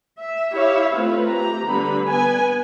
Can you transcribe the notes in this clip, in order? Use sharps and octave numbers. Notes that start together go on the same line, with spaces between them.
E5
E4 G4 C#5 E5 F5
A3 C4 F4 B4
A3 G4 A#5
D3 G3 B3 B4 B5
B3 B4 G#5